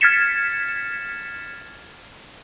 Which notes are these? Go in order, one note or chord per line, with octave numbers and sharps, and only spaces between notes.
F6 G#6 A6 B6 C#7 E7